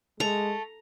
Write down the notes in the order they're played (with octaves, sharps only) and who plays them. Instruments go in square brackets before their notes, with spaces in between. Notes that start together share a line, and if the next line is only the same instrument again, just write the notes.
[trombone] G#3 [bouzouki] A3 [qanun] A#5